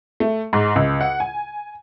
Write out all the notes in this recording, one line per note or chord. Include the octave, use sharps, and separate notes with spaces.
A3
G#2
C#2
F#5
G#5